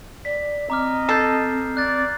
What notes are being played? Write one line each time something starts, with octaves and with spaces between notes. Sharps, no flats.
D5 B6
C4 D#5 A#5 D6 F6
A4 G6 C7
D5 F#6 A6